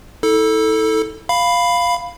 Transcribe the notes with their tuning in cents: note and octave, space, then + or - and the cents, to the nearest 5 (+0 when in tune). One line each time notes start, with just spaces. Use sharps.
E4 -40 A4 +0
F5 +0 B5 +5